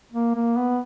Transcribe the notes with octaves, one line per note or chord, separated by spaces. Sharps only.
A#3
A#3
B3